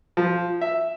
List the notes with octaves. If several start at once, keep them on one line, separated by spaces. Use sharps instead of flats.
F3
E5